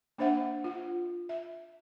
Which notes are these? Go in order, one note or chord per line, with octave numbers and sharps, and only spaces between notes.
A#3 D4 C5 E5 F#5
F4
E5